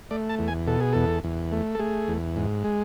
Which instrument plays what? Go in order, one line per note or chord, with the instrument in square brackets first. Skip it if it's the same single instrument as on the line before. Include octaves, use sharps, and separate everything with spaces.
[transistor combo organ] A3 D5
A5
E2
G#5
B2 A4
G#4
E2 A4
E2
A3
A4
A3 G#4
E2
G#2
G#3